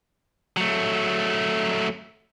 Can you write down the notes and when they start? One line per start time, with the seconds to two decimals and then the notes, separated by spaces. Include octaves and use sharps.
0.57 F#3 A3